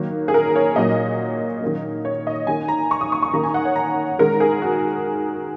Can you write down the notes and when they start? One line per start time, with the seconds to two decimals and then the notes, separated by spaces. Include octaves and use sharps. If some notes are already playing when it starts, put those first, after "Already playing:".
Already playing: D#3 F#3 A#3
0.28 G#4
0.34 A#4
0.55 C#5
0.76 A#2 F#3 A#3 D#5
1.62 D#3 F#3 A#3
2.05 C#5
2.27 D#5
2.47 D#3 A#3 G#5
2.68 A#5
2.91 C#6
3.01 D#6
3.12 C#6
3.23 C#6
3.33 D#3 A#3 A#5
3.43 G#5
3.54 F#5
3.65 C#5
3.76 A#5
4.19 D#3 G#3 A#4
4.40 G#4
4.62 F#4